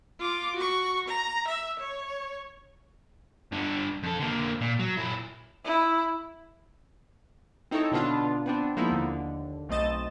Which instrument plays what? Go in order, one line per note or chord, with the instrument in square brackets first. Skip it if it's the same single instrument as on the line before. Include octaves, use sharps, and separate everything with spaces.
[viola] F4 D6
F#4 C#6
A#5
E5
C#5
[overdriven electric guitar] G2 D3
F2 A4
D3 A#3
A#2
F#3
A#2 E4
[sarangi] E4
[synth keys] C4 D#4 E4 A4 C#5
B2 D3 B3 D4 F4
B3 C4 D4
F3 G#3 A#3 B3 D#4 E4
D#2 D3
B1 A3 C4 D#5 A6 E7